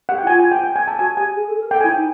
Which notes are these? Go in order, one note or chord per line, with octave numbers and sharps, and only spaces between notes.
G4 F#5
G5
E4
F4 G#5
G#5
G5
G5
G#5
A5
F#4 G#5
G4 G#5
G#4
A4
A#4
A4 G5
E4 G#5
G5
D#4